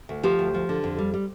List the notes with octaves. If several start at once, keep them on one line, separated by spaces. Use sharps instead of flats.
D2
F3 G4 C5
D2
F3
D3
F2
G3
G3